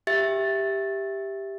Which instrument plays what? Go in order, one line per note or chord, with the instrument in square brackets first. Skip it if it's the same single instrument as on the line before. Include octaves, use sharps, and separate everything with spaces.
[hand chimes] G4 E5 A6